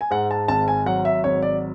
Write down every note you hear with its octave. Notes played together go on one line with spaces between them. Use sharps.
G#5
G#2 F#5
A5
G#1 A5
G#5
F#3 F#5
E5
G#1 C#5
D5